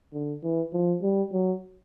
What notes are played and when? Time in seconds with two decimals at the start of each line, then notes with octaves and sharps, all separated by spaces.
0.13 D3
0.43 E3
0.73 F3
1.03 G3
1.33 F#3